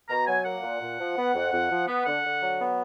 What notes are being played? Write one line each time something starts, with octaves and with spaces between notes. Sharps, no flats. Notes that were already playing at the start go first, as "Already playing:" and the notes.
B2 A#5
F#3 G#5
A#3 F#5
A#2
A#2
F3
B3
F2
F2
F3
B3
D3 F#5
D3
F#3
B3